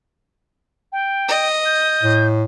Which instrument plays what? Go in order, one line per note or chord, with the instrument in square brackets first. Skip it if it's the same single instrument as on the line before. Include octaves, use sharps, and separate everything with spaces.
[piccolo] G5
[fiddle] D#5
[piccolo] G6
[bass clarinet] A2